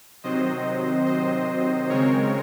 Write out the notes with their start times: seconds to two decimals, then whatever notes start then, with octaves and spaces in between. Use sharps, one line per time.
0.24 C3 D#3 F#3 C4 C5 D#5
1.06 C5 D#5
1.89 C#3 G#3 C4 A#4 C#5